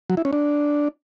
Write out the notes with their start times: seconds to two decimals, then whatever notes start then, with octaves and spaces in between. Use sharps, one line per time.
0.10 F#3
0.17 E4
0.25 C#4
0.33 D4